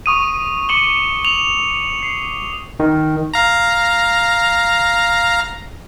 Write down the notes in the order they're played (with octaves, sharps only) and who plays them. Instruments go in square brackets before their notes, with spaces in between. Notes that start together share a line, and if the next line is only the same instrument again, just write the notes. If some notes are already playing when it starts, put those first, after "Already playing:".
[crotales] C#6 D#6 D#7
C#6 D6 C#7 E7 F#7 G7
F7 F#7
C7
[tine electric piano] D#3
[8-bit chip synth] F5 A#5